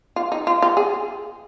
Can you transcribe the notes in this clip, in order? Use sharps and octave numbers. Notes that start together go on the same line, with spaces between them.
F4
D#4
F4
F4
G#4